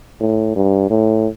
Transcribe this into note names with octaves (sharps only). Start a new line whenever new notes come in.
A2
G2
A2